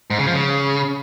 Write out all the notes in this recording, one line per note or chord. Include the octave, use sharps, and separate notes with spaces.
G#2
C#3
F3
C#3